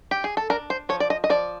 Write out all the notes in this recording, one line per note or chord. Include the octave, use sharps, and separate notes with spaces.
G4
G#4
A4
D4 A#4
C5
F3 C#5
D5
D#5
D#5
F3 D5